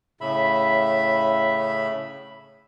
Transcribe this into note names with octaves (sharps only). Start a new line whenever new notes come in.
A2 C#3 E5 B5